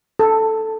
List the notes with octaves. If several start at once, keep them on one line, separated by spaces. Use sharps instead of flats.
A4